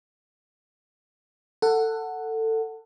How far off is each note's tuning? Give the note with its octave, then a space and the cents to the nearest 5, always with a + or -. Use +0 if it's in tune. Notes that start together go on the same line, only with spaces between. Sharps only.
A4 +20 F#5 +0